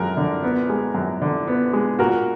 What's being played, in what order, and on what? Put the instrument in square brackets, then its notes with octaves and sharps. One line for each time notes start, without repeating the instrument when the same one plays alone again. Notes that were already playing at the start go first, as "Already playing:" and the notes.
Already playing: [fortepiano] F#2 G#3 [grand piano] A#4
[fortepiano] D3
B3
G#3
F#2
D3
B3
G#3
[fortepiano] A#2 [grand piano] F#4 A#4